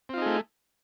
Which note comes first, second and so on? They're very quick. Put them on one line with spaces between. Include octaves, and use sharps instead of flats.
C4 F4 D#4 G#4 A3